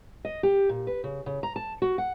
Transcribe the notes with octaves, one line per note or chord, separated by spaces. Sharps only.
D#5
G4
A#2
B4
C#3
C#3
A#5
A5
F#4
F#5